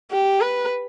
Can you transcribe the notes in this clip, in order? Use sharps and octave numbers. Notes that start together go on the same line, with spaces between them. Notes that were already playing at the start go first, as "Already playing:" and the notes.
G4
B4